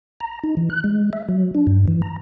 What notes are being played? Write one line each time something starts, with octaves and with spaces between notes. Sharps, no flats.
A#5
D#4
E3
F#6
G#3
E5
F#3
D4
G2
E3
A#5